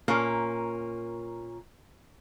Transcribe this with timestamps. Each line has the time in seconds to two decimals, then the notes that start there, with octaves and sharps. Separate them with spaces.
0.08 A#2 A#3 C#4